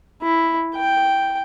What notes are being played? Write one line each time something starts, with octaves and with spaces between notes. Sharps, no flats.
E4
G5